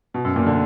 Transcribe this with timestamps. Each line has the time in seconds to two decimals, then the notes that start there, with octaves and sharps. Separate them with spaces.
0.14 B2
0.25 F#2
0.36 A#2
0.46 D3